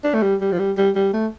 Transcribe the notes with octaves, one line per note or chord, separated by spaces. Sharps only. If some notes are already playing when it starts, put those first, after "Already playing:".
D4
A3
G3
G3
F3
G3
G3
G3
A3